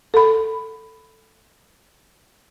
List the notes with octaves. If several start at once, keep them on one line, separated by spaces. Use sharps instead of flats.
A4 B5